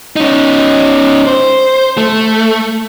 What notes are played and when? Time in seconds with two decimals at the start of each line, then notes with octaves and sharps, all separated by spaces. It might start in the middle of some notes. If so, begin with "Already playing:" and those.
0.16 C#4 D#4
1.27 C5
1.98 A3